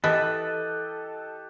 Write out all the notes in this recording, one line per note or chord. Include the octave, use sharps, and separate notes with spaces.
E3 G4 A4 D#5 F#6 A6